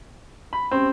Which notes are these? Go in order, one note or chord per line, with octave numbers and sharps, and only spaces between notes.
B5
C4 C#4 G4